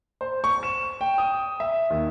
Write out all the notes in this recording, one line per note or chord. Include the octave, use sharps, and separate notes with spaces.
C5
C#6
E7
G5
D#6
E5
D#2